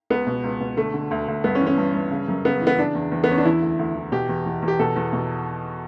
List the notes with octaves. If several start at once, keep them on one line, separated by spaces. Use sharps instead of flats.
C#2 B3
B2
C#2
B2
D3 A3
D3
D2
D2
G2 B3
C#4
E3
C#4
G2
G2
C#3
F#2
C#3 B3
E3
B3
C#3 D4
E2
E2
B3
E2 C#4
D4
E3 E4
D2
D2
E3
B2 G4
E2
E2
E2
G4
B2 A4
E2
B2